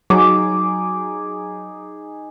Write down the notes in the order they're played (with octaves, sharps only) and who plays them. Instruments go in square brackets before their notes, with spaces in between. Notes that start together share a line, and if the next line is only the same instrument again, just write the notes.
[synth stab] F#3 [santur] D#4 G#4 D6